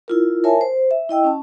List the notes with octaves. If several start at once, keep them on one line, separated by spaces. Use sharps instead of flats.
E4 F4 A#4
A#4 C#5 E5 G#5 A5
C5
E5
E4 D#5 G5 E6
C#4 A5